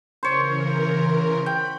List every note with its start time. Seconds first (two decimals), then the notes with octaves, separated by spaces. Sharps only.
0.23 C#3 E3 A#4 C5 C#5
1.46 G5 B5